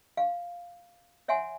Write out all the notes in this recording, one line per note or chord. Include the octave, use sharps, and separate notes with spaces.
F5
C#5 E5 F#5 G#5 C6